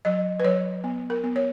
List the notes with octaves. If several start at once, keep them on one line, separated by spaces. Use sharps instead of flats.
F#3 D#5
B4
F#3 C#5
B3
A#4
B3
C#5